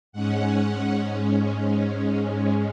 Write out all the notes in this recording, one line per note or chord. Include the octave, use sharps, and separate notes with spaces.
G#2 G#3 C#4 F#5